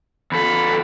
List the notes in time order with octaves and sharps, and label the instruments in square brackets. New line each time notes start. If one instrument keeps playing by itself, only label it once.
[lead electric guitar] E2 A4 [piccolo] B5